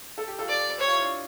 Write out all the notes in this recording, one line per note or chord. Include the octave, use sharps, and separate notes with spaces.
A4
G4
F4 A4
D5
G4 C#5
F4
E4
D4 F4